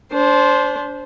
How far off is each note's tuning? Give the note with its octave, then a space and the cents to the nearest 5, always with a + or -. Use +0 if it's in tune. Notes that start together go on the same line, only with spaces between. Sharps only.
D4 -30 C5 +0